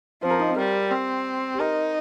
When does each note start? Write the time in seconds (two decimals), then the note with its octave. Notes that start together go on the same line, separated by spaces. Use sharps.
0.23 F3 C4 C5
0.30 A#4 A#5
0.39 D#4 D#5
0.49 C4 C5
0.56 G3 A#4
0.91 C4
1.54 G4
1.59 D#4 A#4